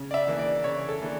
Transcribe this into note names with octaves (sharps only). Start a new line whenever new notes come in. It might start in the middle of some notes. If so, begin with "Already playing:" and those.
Already playing: C#3
D5
E5
E3 A#3 D4
D5
C#3 C#5
A4
E3 A#3 D4